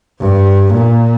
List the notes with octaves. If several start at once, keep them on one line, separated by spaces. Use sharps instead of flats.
G2
A#2